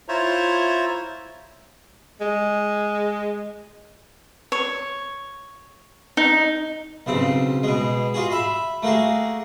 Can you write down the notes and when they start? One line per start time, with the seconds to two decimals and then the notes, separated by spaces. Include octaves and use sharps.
0.08 E4 F4 C5 C#5 E5 A#5
2.21 G#3
4.52 C#5
6.17 D#4
7.06 B1 C#3 C4
7.63 B2 G#3
8.14 F4 F#4 G#4
8.31 E5 B5
8.83 A3 A#3 F#4 G#4